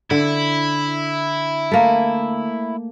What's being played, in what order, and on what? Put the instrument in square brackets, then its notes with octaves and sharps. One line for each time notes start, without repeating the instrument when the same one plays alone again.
[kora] D3 [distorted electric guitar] E4
[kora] A3 A#3